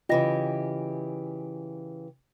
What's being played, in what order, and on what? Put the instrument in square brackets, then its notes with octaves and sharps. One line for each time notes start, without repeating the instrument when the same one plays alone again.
[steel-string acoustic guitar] C#3 E3 G4 [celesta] F4 D#5 A#6